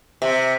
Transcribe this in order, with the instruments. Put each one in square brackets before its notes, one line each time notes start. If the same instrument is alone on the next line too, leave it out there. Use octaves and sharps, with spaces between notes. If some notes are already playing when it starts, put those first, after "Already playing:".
[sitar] C3